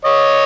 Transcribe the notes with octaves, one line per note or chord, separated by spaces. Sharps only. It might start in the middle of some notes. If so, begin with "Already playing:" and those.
C#5 D#5